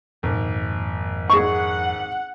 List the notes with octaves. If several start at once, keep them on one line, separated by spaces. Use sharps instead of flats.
G#1 F2 A#2 G#3
G#4 F#5 C#6